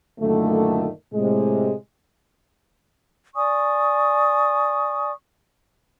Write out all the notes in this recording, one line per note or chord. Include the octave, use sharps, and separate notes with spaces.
F#2 A#2 D3 D#3 A3
A2 C3 G#3
D5 G#5 C#6 D#6